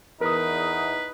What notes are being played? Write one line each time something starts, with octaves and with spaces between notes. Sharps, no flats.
E2 D#4 A#4 B4 D#6